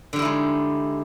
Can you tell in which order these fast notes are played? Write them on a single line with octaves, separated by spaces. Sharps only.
D3 G3 E4 D#4 G#3